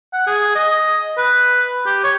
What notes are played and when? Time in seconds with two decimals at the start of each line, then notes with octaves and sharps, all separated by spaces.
0.13 F#5
0.27 G#4
0.55 D#5
1.18 B4
1.86 G4
2.04 C#5